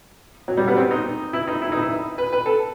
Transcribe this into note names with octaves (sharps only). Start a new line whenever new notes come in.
F#3
G3
B3
C4
D#4
E4
D#4
E4
D#4
E4
B4
B4
A4